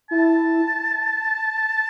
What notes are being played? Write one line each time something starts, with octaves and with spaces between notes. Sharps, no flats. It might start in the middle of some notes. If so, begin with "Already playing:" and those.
E4 A5